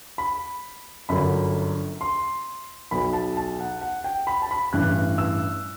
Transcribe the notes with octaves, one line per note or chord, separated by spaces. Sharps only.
B5
G1 F#2 D3 B5
C6
B1 B2 B5
A5
A5
F#5
F#5
G5
B5
A5
B5
A1 G2 E3 F#6
E6